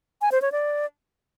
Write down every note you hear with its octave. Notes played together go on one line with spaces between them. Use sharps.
G#5
C5
C#5
D5